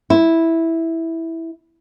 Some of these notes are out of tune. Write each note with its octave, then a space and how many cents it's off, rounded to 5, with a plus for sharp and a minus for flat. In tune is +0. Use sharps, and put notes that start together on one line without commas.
E4 -5